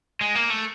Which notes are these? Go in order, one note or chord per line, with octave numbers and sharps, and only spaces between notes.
G#3
A#3
A3